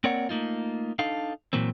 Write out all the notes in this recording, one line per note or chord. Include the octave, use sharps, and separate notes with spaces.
A#3 C4 A#4 C#5 D5 F#5
A3 A#3 D#4 F4
D4 D#4 A4 F5
A#2 E3 F#3 A#3 C4